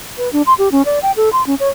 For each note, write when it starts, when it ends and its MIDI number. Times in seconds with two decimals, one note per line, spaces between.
0.18 0.31 71
0.33 0.42 62
0.47 0.54 84
0.58 0.71 67
0.72 0.82 61
0.85 0.99 74
1.02 1.12 79
1.16 1.29 69
1.33 1.45 84
1.46 1.55 61
1.60 1.69 73